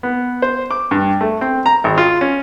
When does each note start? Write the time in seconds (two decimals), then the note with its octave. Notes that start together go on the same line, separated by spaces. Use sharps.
0.03 B3
0.42 C5
0.71 D6
0.91 G2
1.21 A3
1.41 C4
1.66 A#5
1.84 G#1
1.98 F4
2.21 C#4